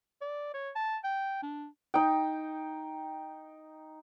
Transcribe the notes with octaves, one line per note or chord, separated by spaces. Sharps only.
D5
C#5
A5
G5
D4
D#4 G5